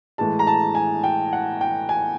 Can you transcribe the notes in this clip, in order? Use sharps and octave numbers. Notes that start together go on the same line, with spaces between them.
A2 E3 G#3 A5
A#5
A5
G#5
G5
F#5
G5
G#5